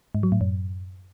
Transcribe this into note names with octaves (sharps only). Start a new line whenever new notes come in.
G#2
F#3
A2
F#2